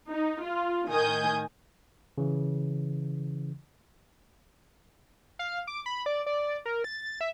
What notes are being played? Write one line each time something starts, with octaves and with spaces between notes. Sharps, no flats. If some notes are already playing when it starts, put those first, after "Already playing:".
D#4
F4
A2 D#3 G#5 D#6 G6
C#3 E3
F5
D6
B5
D5
D5
A#4
A6
E5